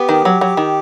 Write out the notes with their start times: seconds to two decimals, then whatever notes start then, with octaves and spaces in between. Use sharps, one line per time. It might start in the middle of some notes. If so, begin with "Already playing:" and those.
Already playing: B3 G4
0.09 D#3
0.25 F#3
0.41 F#3
0.57 D#3